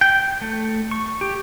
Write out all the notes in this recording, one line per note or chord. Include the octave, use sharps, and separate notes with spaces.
G5
A3
C#6
G4